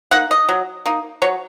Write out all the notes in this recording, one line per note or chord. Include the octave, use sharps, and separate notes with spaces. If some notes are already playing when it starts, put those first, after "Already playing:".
A#3 D#4 F#5
D#5
F#3
A#3 D#4
F#3 C#5